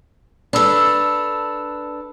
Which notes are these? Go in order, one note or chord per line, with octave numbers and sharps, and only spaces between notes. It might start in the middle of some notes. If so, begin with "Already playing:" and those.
D4 A4 B4 B5 E6